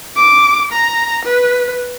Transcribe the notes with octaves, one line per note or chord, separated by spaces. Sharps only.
D6
A#5
B4